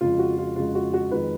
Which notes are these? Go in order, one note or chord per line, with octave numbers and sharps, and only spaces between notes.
F2 C#3 G#3 F4
F#4
F4
F2 C#3 G#3 F4
F#4
F#4
F2 D#3 G#3 B4